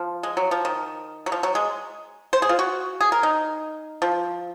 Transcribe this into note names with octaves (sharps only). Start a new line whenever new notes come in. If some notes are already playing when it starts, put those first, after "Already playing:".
Already playing: F3
G#3
F#3
F3
D#3
F#3
F3
F#3
G#3
C5
G#4
F4
F#4
G#4
A#4
D#4
F3